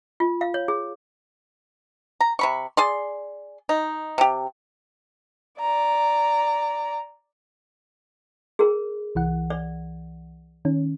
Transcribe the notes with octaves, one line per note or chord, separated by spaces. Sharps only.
F4
F5
C#5
G#4
A#5
C3 B5 C#6
G#4 D5 C6
D#4
C3 G4
D5 A#5
G#4 A#4
C2 E3 F#5
D5
D#3 C#4